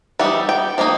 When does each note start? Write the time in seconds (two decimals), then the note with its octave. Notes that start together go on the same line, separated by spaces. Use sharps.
0.19 E3 G3 D#4 F#5
0.49 G5
0.78 F3 A#3 D#4